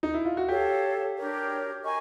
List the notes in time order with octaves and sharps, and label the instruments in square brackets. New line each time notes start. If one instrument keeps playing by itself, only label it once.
[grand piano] D#4
E4
F4
F#4
[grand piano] G4 [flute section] A4 C#5 F5
[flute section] D4 G4 A#4 C#5
A#4 D#5 G#5 C#6